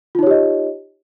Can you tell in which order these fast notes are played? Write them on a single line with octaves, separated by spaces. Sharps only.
F4 D#4 C#5 G4 D#5